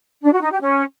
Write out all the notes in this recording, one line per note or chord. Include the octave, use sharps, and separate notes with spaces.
D4
F#4
D#4
G4
C#4